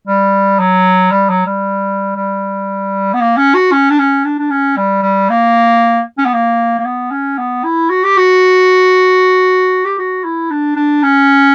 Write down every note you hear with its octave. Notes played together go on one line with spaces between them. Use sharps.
G3
F#3
G3
F#3
G3
G3
B3
A#3
C#4
F#4
C#4
D4
C#4
D4
D4
C#4
G3
G3
A#3
C#4
B3
A#3
A#3
B3
C#4
B3
E4
F#4
G4
F#4
G4
F#4
E4
D4
D4
C#4